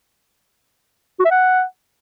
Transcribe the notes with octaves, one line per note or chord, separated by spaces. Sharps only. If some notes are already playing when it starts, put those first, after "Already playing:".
F#4
E5
F#5